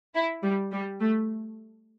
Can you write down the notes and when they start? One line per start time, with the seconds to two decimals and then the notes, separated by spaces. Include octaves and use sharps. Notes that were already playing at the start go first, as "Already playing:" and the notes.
0.15 E4
0.43 G3
0.72 G3
1.01 A3